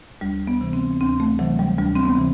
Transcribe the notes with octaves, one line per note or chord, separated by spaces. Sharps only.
D2 G3
B3
C3 E3
C4
D2 C4
A3
C3 E3 F#3
G3
D2 G3
C4
B3
C3 E3